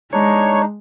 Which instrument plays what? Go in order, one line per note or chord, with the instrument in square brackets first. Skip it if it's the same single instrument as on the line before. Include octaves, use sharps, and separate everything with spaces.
[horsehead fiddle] G#3 [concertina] D4 D#4 [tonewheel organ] C#5